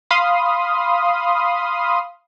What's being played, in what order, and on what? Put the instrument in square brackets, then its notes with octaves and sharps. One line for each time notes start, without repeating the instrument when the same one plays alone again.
[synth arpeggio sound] F5 B5 C6 D#6